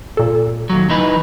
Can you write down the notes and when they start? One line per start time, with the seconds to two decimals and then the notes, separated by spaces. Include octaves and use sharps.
0.17 A#2 A4
0.70 D#2 F#3
0.90 E3 D#4 B4